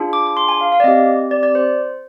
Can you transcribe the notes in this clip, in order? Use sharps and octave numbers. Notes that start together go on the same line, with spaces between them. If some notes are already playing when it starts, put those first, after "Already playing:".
Already playing: D4 F4 G#4
D6
D6
C6
G#5
F5
F5
D5
C4 G4 D#5
D5
D5
C5